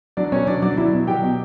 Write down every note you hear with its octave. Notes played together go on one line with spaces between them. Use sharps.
F#3 D4 D5
B2 C#4 C#5
F#3 D4 D5
F#3 D4 D5
F#3 E4 E5
B2
F#3 G4 G5
B2